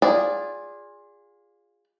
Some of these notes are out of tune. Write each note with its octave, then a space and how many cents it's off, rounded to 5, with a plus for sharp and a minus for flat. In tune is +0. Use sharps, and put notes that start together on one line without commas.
F4 +15 G#4 -15 D5 -15